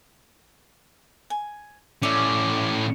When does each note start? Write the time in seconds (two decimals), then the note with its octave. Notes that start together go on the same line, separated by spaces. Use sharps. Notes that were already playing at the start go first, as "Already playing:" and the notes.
1.30 G#5
2.03 A2 C#4 D5 E5